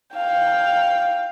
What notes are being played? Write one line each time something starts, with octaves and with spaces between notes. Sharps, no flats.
F5 G5